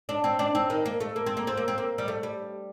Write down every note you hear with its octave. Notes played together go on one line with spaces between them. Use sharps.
D4
C4
D4
C4
D#3
A#3
A3
A#3
C4
A#3
C4
A#3
C4
A#3
G3
A3
G3